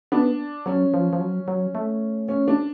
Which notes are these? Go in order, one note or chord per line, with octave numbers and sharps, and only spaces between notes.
B3 D4
F#3 C#4
F3
F3
F#3
F#3
A3
C#4
D4